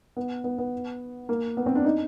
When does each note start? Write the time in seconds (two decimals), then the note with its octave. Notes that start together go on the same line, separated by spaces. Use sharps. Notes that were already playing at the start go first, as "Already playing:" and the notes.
0.17 B3
0.44 B3
0.58 B3
1.29 A#3
1.57 B3
1.66 C4
1.75 D4
1.84 D#4